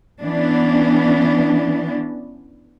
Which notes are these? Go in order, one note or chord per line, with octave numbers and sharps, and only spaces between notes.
E3 B3 C#4 D4